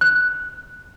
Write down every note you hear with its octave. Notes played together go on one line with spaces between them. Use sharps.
F#6